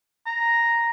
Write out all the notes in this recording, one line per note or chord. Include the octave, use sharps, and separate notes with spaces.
A#5